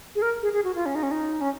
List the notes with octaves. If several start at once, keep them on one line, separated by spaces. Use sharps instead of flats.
G#4
A#4
G#4
G#4
F#4
F4
C#4
D#4
C#4
D#4
C#4